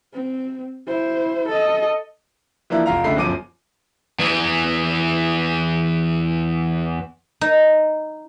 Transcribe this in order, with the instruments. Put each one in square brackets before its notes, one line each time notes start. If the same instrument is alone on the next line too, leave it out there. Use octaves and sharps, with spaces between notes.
[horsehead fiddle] C4
E4 C5
A4 D#5
[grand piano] E3 F3 A#3 D4 E4
F1 F4 F5 A#5
C#2 D3 A3 B5 C7
G1 F#2 F3 D6 D#7
[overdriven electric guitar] E2 E3
[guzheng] D#4